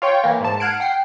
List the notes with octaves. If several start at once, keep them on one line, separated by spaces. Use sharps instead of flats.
F4 C#5 G5 C#6
E3 A#3
G#2 A5
F#5 F6 F#6 G#6 C7 D7
F#5 G5 C7